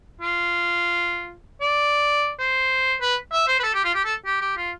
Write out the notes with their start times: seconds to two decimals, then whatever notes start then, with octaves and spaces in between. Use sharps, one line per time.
0.21 F4
1.61 D5
2.39 C5
3.01 B4
3.32 E5
3.48 C5
3.59 B4
3.63 A4
3.74 G4
3.84 F4
3.95 G4
4.05 A4
4.26 G4
4.41 G4
4.57 F4